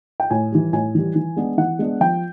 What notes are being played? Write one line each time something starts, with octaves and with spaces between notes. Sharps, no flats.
G5
A2 G#5
E3 G3
A2 G#5
E3 G3
E3
G#3 B3 D4
E3 F#5
G#3 B3 D4
F3 G5